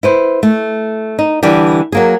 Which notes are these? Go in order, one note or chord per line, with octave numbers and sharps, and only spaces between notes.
E4 B4 C5
A3
D#4
D3 E3 G3 D4 G4
F#3 A#3 G#4